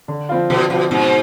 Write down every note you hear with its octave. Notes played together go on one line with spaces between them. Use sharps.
D3
F3 C4 F4
B2 D3
B2 F3 C4 F4
G#2 B2